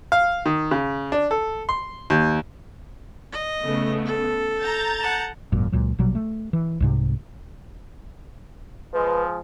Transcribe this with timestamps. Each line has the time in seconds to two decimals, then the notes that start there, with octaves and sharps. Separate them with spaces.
0.12 F5
0.46 D#3
0.71 C#3
1.12 D4
1.31 A4
1.69 C6
2.10 D#2
3.32 D#5
3.64 C#3 A3 B3
4.05 A4
4.59 A#5 G6 A6
5.00 F#5 A5
5.52 G#1 F#2 A#2
5.72 C#2 A#2 F#3
5.99 A#1 B2 F#3 G3
6.15 A3
6.53 E3
6.80 C2 G#2 C3
8.94 F3 G#3 B4